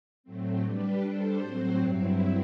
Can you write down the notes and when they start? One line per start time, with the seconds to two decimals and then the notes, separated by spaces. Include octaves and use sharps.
0.24 A2 F#3 A3 C4
0.62 G3 D4 G4 B4
1.00 G3 D4 A4 C5
1.39 A2 F#3 C4 F#4 C5
1.78 G2 F#3 C4 E4